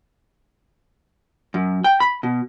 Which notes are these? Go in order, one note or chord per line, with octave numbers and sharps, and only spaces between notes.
F#2
G5
B5
B2